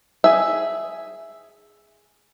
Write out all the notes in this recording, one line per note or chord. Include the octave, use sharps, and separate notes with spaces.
G#4 E5